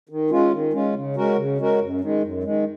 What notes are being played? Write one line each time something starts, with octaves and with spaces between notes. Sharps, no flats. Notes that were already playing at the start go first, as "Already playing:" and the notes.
D#3
G#3 C#4 F4
D#3
G#3 C#4 F4
C#3
G#3 C#4 F#4 A#4
C#3
G#3 C#4 F#4 A#4
F#2
D#3 G#3
F#2
D#3 G#3